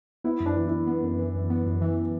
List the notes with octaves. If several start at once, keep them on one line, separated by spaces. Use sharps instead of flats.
B3 E4
F#2
D4
E3
F#2 E4
B3
F#2
E3
F#2
B3
F#2
E3